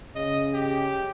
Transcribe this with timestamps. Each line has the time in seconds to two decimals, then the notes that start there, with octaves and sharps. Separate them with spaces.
0.15 C#3 D#5
0.54 G4